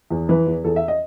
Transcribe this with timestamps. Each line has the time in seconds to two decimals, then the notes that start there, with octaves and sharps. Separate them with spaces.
0.11 E2
0.29 E3 B4
0.47 E2
0.64 E2 A4
0.76 E5
0.88 D#5